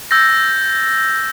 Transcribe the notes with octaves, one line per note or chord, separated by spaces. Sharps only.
E6 G6 A6 A#6